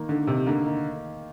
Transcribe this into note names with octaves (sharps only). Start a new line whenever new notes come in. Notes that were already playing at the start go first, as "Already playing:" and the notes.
Already playing: D#3 A#3
D3 D#4
C3 D#3
D3 A#3
D#3